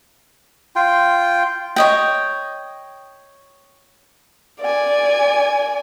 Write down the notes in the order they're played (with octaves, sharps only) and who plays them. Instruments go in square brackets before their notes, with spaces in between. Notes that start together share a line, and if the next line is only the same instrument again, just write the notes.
[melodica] F4 G5
[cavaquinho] C#5 D#5 G5
[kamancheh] D5 G#5